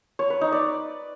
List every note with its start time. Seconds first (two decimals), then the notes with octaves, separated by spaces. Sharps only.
0.19 C#5
0.30 B4
0.41 D#4
0.52 D5